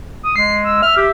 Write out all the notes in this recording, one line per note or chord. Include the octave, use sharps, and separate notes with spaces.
D#6
G#3 C7
E6
E5 F6
G4